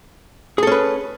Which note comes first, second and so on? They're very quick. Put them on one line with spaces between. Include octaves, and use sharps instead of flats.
G#4 A4 C#4 B4